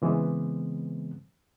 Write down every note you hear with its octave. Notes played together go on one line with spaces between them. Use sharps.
C#3 E3 G#3 B3 C4